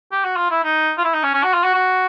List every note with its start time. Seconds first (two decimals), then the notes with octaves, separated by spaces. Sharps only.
0.12 G4
0.24 F#4
0.37 F4
0.50 E4
0.64 D#4
0.98 F4
1.04 E4
1.14 D#4
1.24 C#4
1.34 C#4
1.44 F#4
1.54 F4
1.64 F#4
1.74 F#4